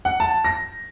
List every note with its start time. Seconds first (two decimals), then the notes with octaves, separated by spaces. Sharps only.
0.05 F#5
0.20 A5
0.45 A#6